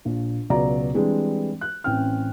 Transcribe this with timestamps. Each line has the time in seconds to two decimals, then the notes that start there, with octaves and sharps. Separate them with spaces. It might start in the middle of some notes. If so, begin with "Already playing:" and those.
0.05 A#1 A#2
0.50 C#2 B2 F#3 D5 A#5
0.94 E3 G3 G#3 C4 D4
1.61 F#6
1.84 A1 C4 C#4 G5 F6